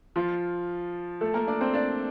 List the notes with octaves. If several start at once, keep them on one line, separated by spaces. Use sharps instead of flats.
F3 F4
A3 A4
A#3 A#4
D4 D5
C4 C5
D4 D5